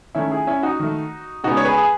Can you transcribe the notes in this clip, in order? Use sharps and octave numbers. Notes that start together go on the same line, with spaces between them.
D#3 A3 C#4 E4
E4 G#4
C#4 E4
D#4 F#4
D#3 A3
C#3 G#3 B3 D#4 F#4
C#5
G#4 B4
G#4